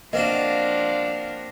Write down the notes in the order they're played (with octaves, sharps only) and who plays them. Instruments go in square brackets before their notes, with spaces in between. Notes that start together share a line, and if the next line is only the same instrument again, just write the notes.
[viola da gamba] F3 D4 [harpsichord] A#3 C4 F#4 [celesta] D#5 [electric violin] F5